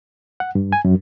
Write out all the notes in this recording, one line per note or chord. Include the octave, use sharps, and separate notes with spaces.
F#5
G2
G#5
F#2